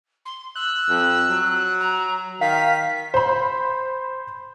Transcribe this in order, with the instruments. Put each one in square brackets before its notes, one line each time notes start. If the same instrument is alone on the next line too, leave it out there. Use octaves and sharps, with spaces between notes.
[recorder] C6
[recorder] E6 [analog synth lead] F#6
[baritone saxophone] F2
F#3
[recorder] A#5
[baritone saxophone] D#3 [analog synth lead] F5 [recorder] B6
[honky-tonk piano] C5 B5